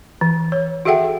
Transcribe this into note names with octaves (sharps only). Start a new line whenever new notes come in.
E3
C#5
F#4 G#4 A4 E5 F#5 G5